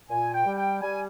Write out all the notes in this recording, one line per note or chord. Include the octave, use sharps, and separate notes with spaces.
A#2 G#5
G5
G3
G5
G3 G#5